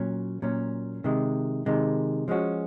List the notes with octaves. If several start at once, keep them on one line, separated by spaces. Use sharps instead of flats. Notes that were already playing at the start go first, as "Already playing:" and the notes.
Already playing: A#2 F#3 C#4
A#2 F#3 C#4
C3 D#3 G#3
C3 D#3 G#3
F3 G#3 C#4 F#4